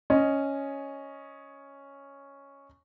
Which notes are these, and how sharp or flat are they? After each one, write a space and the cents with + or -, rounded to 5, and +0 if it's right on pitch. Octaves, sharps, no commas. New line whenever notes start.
C#4 +0 D#5 +0